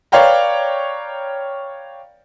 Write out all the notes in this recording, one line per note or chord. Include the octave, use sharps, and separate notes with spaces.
B4 C#5 D5 F5 G5 A#5